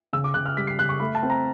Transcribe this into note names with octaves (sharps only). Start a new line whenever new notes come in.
C#3 E6
D6
C#3 F#6
F6
G3 B6
C7
C#3 F#6
C#6
A3 B5
A5
C4
A#5